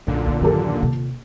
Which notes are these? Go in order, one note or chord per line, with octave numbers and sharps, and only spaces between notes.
B1 F#2 A#2 D3
A#3 C#4
D#1 G2 E3 G4 A4
C3 F4